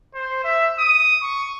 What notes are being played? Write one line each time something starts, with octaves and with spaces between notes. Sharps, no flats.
C5
E5
D#6
C#6